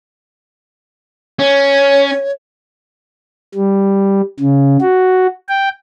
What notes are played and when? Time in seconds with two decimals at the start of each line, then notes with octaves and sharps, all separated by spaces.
1.39 C#4 C#5
3.55 G3
4.40 C#3
4.82 F#4
5.49 G5